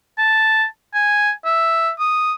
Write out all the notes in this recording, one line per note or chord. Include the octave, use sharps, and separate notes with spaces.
A5
G#5
E5
D#6